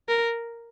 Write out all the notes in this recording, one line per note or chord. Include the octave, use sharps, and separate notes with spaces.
A#4